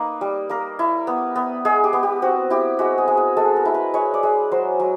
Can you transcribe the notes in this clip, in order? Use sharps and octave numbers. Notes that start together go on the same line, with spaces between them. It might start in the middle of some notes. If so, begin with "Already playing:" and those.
Already playing: A#3 D#4 B4
G3
A#3 A#4
E4
B3
B3
G#3 G#4
G4
B3
G4
C4 F#4
E4 G4
G#3 F#4
G#4
G#3
G#4
G#3 A4
A#4
E4
B4
G#3 C#5
D5
G#3
F#3 C5
F#3